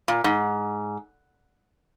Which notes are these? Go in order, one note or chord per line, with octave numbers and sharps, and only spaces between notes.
A#2
G#2